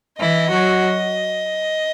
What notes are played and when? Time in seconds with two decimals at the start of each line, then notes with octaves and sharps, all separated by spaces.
0.19 E3 E4 D#5
0.50 F#3 F#4